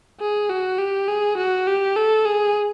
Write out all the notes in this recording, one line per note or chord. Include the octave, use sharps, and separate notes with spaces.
G#4
F#4
G4
G#4
F#4
G4
A4
G#4